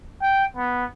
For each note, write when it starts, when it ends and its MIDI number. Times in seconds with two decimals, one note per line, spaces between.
0.21 0.44 79
0.56 0.85 59